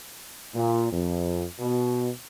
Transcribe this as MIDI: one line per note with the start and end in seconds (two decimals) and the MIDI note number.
0.53 0.87 46
0.91 1.44 41
1.59 2.08 47